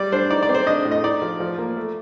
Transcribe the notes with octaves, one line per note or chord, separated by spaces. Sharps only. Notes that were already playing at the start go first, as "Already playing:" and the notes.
Already playing: G3 D5
D4 C5
D#4 D5
D5
C4
C5
D4 D#5
A2
D#5
D#4 D5
F3
F3
A#3
A3